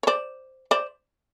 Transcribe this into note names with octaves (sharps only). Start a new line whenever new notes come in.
C#5
C5 D5
C5 D5